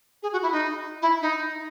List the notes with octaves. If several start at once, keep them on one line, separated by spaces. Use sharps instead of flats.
G#4
F#4
E4
D#4
E4
D#4